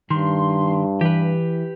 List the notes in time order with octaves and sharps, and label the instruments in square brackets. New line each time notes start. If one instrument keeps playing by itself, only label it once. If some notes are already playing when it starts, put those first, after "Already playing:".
[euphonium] G2 [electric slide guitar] D#3 [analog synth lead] C6
[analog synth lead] E3 [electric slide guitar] G4 B4